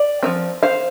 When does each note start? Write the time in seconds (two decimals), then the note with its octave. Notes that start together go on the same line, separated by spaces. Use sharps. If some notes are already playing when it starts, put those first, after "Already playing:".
Already playing: D5
0.23 F3 A3 C4
0.63 C5 F5